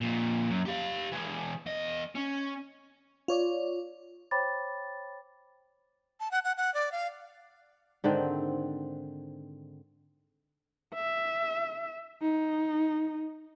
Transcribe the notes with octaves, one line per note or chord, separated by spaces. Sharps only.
F2 A#2
F#2
G4 F5
E3 G#3
E2 D#5
C#4
F4 C#5 D5
C5 C#5 G5 B5 D6 A6
A5
F#5
F#5
F#5
D5
F5
G#2 D3 D#3 C4
E5
D#4